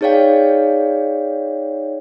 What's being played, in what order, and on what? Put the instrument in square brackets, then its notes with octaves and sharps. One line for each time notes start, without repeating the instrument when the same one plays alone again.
[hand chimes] D#4 G#4 C#5 D5 F5 G5